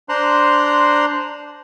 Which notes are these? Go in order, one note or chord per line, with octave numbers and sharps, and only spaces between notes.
D4 C5 A#5 C6 F#6